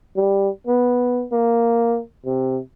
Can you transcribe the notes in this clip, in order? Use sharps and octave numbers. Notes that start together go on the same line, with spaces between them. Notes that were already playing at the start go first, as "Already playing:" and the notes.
G3
B3
A#3
C3